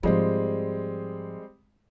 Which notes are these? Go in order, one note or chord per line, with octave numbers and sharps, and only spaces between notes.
G#2 F3 G3 G#3 C4